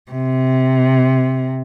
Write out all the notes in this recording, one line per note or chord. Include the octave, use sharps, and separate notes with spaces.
C3